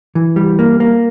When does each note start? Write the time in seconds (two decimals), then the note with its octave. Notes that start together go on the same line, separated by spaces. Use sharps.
0.15 E3
0.36 G3
0.59 A#3
0.80 A#3